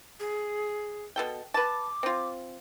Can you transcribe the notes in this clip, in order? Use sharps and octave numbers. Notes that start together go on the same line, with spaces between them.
G#4
B2 A4 G5
B4 A5 D6
C4 F4